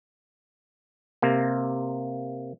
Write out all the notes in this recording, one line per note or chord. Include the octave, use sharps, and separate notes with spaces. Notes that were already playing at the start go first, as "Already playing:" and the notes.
C3 A#3